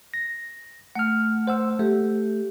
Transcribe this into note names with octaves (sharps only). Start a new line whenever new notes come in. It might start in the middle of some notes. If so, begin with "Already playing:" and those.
A#6
A3 F#5 F6
C5 F#5 E6
A3 G4